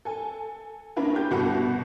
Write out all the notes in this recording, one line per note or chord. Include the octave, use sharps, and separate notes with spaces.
A4 G#5
A#3 C#4 D4 E4 A#4 B4
D4 G4 G6
G1 C2 B2 F#4 G6